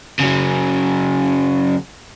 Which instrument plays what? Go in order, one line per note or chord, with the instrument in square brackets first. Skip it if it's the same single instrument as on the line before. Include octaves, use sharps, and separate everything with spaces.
[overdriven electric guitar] C#3 F#3